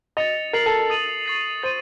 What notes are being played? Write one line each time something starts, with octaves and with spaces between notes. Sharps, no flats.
D#5 A6 C#7 F7
A#4 A6 C7 F#7
A4
D#6 A6 D#7 F#7
C#6 A6 C7
C5 A6 D#7